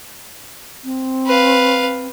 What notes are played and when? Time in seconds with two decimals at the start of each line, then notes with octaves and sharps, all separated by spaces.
0.84 C4
1.26 B4 F5